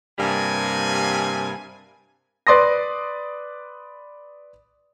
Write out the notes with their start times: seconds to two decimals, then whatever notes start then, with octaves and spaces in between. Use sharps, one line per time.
0.18 G2 C3 G3 A#3 G#5
2.47 B4 D5 C6 D#6 A#6